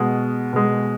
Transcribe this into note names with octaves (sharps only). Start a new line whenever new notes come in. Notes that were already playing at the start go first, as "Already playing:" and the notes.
Already playing: B2 G#3
B2 G#3